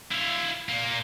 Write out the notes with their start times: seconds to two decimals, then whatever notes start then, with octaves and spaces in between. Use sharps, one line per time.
0.12 E4 F5
0.69 A#2 A#3